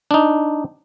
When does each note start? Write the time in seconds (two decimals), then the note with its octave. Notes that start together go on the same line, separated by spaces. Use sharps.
0.11 D4 D#4